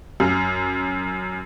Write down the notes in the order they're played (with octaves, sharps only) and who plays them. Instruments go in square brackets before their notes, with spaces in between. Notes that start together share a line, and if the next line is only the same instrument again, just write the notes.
[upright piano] F#2